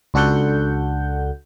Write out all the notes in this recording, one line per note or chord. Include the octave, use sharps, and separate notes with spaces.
C#2 D4 F#4 A4 F#5 G6